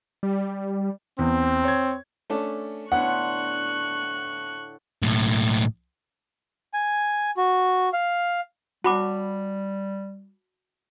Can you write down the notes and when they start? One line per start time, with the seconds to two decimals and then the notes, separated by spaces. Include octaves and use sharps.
0.23 G3
1.19 E2 C4
1.64 C#5 G#6
2.30 A3 C#4 D4
2.92 A2 D3 B3 F#5 C6 C#6 F#6
5.02 B1 A2
6.74 G#5
7.37 F#4
7.93 F5
8.84 G3 F#4 A5 B5 D6